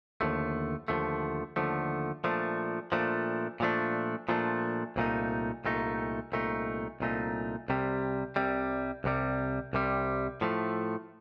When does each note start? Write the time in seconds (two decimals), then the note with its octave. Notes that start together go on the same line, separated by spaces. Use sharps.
0.21 D#2 D3 F3 A3
0.88 D#2 D3 F3 A3
1.56 D#2 D3 F3 A3
2.24 A#2 F3 A3 D4
2.92 A#2 F3 A3 D4
3.60 A#2 F3 A3 D4
4.29 A#2 F3 A3 D4
4.96 C2 A#2 A3 D#4
5.65 C2 A#2 A3 D#4
6.32 C2 A#2 A3 D#4
7.00 C2 A#2 A3 D#4
7.68 C2 C3 G3
8.36 C2 C3 G3
9.04 C2 C3 G3
9.73 C2 C3 G3
10.41 A2 F3 A3